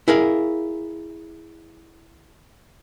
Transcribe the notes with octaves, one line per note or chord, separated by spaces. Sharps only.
E4 G#4 A#4 F5